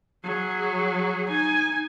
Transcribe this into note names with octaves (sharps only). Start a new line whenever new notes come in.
F#3 G#4
D#4 G#5